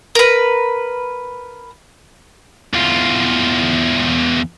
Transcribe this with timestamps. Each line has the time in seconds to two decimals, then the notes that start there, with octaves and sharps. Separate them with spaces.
0.15 A#4 B4
2.74 E2 F4